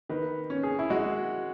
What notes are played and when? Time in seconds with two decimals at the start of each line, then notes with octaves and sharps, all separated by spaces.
0.09 D#3 B4
0.50 C#4
0.63 G#4
0.79 E4
0.90 G#3 F#4